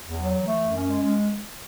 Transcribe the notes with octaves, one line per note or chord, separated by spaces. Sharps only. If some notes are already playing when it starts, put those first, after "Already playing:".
E2
F#3
E3
A3
F#2
C#4
G#3
G#3